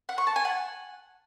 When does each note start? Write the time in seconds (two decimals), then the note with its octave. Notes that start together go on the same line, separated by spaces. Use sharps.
0.09 F#5
0.18 C#6
0.27 A5
0.36 G#5
0.45 F#5